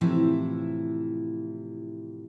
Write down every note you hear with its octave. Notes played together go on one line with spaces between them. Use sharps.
A2 C3 E3 F3 E4